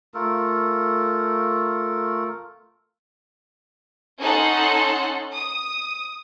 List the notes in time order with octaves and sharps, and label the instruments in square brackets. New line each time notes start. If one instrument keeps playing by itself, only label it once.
[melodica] A3 F4 A4 A#4
[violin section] C#4 D#4 A4 F#5 C6
D#6